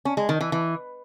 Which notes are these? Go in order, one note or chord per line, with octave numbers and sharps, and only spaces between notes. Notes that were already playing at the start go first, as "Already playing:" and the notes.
C#4
G#3
D#3
E3
E3